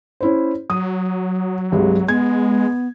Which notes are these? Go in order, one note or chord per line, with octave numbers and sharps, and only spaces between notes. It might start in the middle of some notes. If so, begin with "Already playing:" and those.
C#4 E4 C5
F#3 D#6
C2 G2 G#3
G#3 B3 G#6